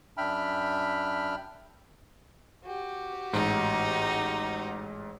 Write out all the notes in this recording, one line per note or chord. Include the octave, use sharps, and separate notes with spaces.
F#2 D4 E5 G5 B5 F6
F#4 G4
A1 G#2 D#4